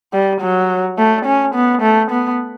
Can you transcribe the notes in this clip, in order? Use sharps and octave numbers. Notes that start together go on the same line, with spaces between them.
G3
F#3
A3
C#4
B3
A3
B3